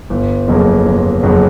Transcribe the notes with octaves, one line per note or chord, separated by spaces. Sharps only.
G1
F2 C#3 F#3 A#3
G1
F2 C#3 F#3 A#3